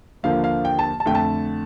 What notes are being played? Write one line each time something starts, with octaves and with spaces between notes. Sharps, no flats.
D#2 D3 F3 A#3 F5
F5
G5
A5
A5
F2 D3 A3 G5
A5